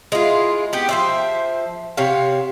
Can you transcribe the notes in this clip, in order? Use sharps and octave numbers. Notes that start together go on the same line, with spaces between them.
G#3 E4 F4
B3 G4
F3 C5 E5
C3 C#5 F5